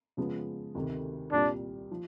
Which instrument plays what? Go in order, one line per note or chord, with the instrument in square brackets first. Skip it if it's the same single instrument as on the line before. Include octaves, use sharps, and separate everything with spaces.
[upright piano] C#3 F3 G#3 B3
D2 C3 D#3
[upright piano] C2 A#2 G3 [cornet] D4
[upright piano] F3